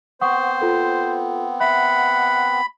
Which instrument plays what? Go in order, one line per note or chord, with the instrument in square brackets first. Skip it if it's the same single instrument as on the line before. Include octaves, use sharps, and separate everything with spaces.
[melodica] B3 C4 [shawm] C5 [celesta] F#5 C#6 D#6
[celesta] F4 A4
[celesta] E5 [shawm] F#5 [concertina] B5